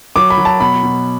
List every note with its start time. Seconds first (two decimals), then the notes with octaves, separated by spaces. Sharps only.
0.16 F#3 D6
0.30 B5
0.38 F#3
0.45 A5
0.60 B2 B5
0.83 B2